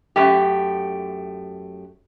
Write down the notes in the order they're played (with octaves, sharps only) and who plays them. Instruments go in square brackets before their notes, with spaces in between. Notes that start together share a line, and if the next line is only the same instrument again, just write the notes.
[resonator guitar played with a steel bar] F#2 A3 G4